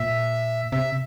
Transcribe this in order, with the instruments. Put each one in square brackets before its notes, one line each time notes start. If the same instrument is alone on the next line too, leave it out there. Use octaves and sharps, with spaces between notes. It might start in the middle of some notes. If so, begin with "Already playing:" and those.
Already playing: [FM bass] A#2 [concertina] E5
[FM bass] C3 [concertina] E5